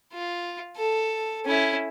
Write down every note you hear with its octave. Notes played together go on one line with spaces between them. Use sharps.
F4
A4
C#4 E4